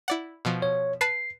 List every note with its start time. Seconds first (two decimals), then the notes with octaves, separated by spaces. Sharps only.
0.08 E4 D5 F#5
0.45 B2 F3
0.62 C#5
1.01 B4 A5 C7